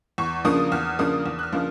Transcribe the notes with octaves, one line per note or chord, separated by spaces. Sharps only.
E2 C#6
C#3 F3 A#3 D4 D#6
E2 F6
C#3 F3 A#3 D4 D#6
E2
F#6
F6
C#3 F3 A#3 D4